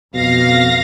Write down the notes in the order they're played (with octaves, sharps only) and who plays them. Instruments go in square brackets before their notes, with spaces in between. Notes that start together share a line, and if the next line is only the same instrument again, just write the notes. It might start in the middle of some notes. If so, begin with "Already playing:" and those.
[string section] F2 F5 A#6 [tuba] B2